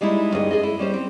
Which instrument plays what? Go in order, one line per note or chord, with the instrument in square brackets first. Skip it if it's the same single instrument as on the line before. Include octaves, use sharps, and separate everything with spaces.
[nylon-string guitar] G3 G#3 D#4 E4
D2 G2 C#4 G#4 D#5
G#4 A4 D#5
E4
G3 C#4 C5
C4